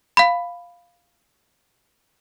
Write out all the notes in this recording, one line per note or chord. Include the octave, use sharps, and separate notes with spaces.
F5 B5